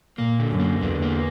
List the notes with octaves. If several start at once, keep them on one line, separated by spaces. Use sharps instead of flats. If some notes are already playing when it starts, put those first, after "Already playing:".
A#2 A#3
D3
F#2
A#3
E2 D3
A#3